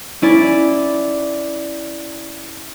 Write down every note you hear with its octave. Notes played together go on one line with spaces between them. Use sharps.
C#4 E4 D5